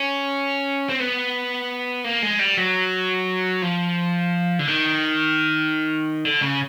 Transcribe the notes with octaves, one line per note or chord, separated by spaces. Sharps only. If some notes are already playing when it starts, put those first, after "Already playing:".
Already playing: C#4
C4
B3
A#3
G#3
G3
F#3
F3
D3
D#3
D3
C#3